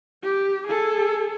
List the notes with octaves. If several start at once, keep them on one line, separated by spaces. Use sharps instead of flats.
G4
G#4 A4